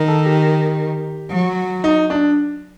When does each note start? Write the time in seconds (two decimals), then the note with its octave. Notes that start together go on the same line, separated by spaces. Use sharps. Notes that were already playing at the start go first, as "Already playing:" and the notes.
Already playing: D#3
0.08 A4
0.25 G4
1.31 F#3
1.84 D#4
2.10 D4